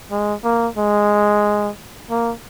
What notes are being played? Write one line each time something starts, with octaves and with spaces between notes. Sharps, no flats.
G#3
A#3
G#3
A#3